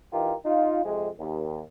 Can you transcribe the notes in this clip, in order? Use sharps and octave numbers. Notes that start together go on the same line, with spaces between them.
E3 D#4 F4 G4 A#4
D#4 F4
F2 C3 G#3
D#2